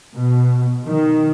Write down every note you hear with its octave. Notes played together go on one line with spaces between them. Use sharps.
B2
D#3